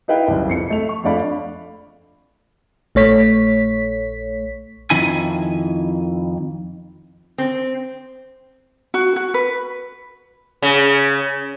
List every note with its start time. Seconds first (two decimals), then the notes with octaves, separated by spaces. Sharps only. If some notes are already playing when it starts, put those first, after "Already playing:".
0.08 D#4 E4 B4 F5 G5
0.28 F#1 C2
0.48 F2 C7 C#7
0.70 A3 F7
0.89 C#6
1.04 F2 A3 D4 D5 F5 B5
2.95 A#1 A3 C#5 B6
4.90 F2 D#3 E4 G#5
7.38 C4
8.94 F#4
9.16 F#4
9.34 B4
10.62 C#3